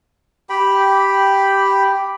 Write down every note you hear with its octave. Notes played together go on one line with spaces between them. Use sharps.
G4 G5 B5